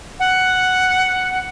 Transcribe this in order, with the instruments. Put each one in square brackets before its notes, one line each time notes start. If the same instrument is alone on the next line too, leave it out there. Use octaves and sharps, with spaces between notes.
[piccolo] F#5